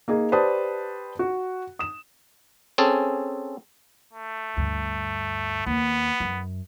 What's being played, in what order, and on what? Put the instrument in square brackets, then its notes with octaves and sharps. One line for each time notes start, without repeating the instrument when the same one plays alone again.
[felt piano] A#3 D#4 G#4
G4 B4 C5 D5 A5 D#6
F#4
D#6 E7
[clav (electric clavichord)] C4 C#4 G#4 A4
[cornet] A3
[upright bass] D2 G2
[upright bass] D#2 [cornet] B3
[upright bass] F#2